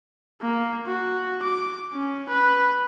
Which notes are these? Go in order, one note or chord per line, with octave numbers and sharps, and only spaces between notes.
A#3
F#4
D6
C#4
B4